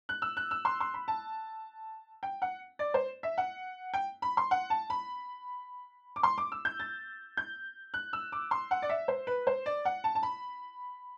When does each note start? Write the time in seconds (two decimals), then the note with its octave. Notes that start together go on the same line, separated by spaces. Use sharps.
0.09 F#6
0.22 E6
0.37 F#6
0.51 E6
0.65 C6
0.80 C6
0.94 B5
1.08 A5
2.23 G5
2.42 F#5
2.79 D5
2.94 C5
3.23 E5
3.38 F#5
3.94 G5
4.22 B5
4.37 C6
4.51 F#5
4.70 A5
4.90 B5
6.16 D6
6.23 C6
6.38 D6
6.52 E6
6.65 G6
6.80 A6
7.37 G6
7.94 F#6
8.13 E6
8.32 D6
8.51 C6
8.71 F#5
8.82 D5
8.89 E5
9.08 C5
9.27 B4
9.47 C5
9.66 D5
9.85 F#5
10.04 A5
10.15 A5
10.23 B5